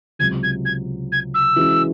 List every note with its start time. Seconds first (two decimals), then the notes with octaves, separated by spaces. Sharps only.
0.19 C#2 C3 F#3 G#6
0.42 G#6
0.65 G#6
1.11 G#6
1.34 E6
1.56 E3 G#3 C#4 F#4